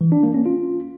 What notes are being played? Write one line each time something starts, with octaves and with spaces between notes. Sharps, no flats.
E3
D4
A#3
C#4
F4